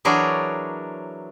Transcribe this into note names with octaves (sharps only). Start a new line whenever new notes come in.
E3 F#3 D4 G#4 A#4 C#5